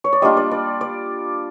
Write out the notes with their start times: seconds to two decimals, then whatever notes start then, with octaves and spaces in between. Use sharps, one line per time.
0.04 C#5
0.13 D5
0.22 G3 A#3 D4 F4 D#5
0.37 D5
0.51 D5
0.81 D5